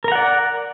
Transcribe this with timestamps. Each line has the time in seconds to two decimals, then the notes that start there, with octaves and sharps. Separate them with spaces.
0.04 A#4
0.08 A#5
0.12 F#5
0.15 D5